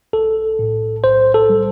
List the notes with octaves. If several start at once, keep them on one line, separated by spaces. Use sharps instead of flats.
B1 A4
A2
B1 C5
A4
G3